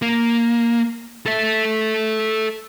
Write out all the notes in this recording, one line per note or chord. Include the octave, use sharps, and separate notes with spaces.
A#3
A4 E5